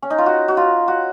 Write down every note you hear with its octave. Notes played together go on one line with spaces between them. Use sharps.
C#4
D#4
F4
F#4
F#4
F4
F#4